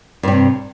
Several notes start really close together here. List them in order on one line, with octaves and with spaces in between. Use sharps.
G2 G3 C3